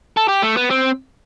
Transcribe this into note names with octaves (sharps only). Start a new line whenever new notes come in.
A4
G4
A3
B3
C4